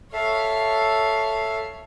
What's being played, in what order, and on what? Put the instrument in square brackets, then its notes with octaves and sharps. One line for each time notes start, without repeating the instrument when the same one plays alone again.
[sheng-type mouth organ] A4 E5 [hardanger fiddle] C#5 F5